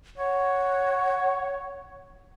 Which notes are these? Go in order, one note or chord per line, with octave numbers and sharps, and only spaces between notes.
C#5 F#5